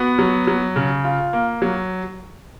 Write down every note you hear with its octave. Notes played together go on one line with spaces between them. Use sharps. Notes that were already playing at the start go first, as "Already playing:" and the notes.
Already playing: B3 F#4
F#3
F#3
C#3
F4
A#3
F#3